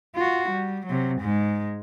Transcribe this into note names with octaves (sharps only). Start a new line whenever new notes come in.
F4 F#4
G3
C3 F#3
G#2 G#3